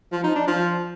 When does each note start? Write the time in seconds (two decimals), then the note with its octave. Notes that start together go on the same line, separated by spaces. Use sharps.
0.12 F3
0.24 D#4
0.36 D4
0.47 F3